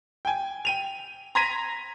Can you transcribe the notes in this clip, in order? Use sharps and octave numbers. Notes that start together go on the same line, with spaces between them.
G5 G#5
G5 D#7 F7
A#5 C6 G#6 A#6 B6 D#7